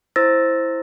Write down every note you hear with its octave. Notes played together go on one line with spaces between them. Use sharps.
E4 C5 E6 A6 A#6